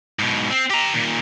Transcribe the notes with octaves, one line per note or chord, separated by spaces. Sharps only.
G#2 B2
C4
G4 A#5
A#2 D#3